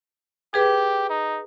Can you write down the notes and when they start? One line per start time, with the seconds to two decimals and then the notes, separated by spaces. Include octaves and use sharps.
0.54 G4 G#4 B4
1.10 D#4